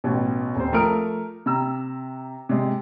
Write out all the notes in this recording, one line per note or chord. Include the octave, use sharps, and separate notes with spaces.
A1 B2
D#1 C4 C5
F3 A3 A#4 D#6 F6 D7
C3 A#5 E6
C3 G#3